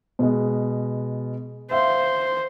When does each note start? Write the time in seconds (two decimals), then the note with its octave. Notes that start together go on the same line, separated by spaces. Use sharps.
0.19 B2 G#3
1.71 C5 E5 F5